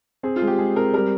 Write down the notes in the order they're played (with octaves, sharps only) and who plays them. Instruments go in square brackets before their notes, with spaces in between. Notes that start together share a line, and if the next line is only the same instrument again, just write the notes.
[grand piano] C4 [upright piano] G#4
[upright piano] F4
[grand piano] G#3
[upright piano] G4
[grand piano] G#3 [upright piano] G#4
[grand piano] C4 [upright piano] A#4
[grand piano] G3 [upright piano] A#4